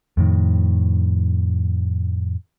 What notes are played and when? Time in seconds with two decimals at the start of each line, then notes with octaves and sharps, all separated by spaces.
0.17 F2 A2 D#3